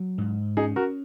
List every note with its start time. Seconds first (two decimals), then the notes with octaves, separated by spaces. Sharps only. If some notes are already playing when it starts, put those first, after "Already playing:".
Already playing: F#3
0.18 G#2
0.57 C#4 D#4 G#4
0.76 F#4 A#4